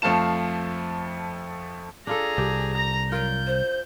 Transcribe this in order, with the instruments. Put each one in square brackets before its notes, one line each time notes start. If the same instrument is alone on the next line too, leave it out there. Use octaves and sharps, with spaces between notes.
[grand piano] F2 F3 A3 F5 A5 E7
[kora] D4 F4 A4 [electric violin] G#4 A#5
[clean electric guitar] C2 [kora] G4
[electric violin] A#5 A#6
[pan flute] F#3 [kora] F4 A#4 [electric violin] G6
[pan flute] C5